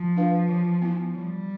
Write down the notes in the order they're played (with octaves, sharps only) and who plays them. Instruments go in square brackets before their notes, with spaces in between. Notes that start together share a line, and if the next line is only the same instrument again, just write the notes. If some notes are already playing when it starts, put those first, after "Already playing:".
Already playing: [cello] F3
[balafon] D4 F4 B4 F5
E3
B3 E4
[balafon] E3 [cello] G3